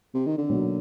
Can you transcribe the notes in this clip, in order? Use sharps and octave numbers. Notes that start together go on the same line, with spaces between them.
C3
D#3
D3
B2 F#3 A#3 D#4 F#4